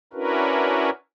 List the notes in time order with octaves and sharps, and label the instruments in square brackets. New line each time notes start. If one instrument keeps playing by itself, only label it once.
[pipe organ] C#4 D4 E4 F#4 A#4 B4